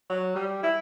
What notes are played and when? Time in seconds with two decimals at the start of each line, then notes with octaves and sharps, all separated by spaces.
0.09 F#3
0.35 G3
0.63 E4